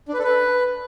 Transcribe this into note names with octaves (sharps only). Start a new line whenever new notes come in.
D4
B4
A4
B4